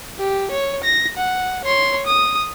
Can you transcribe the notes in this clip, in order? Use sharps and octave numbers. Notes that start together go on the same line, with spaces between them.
G4
C#5
A#6
F#5
C#5 C6
D#6